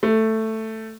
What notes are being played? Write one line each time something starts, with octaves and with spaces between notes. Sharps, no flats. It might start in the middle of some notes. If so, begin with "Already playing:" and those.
A3